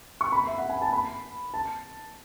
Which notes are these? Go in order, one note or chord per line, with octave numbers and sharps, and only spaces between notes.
C#6
B5
E5
F#5
G#5
A5
B5
A5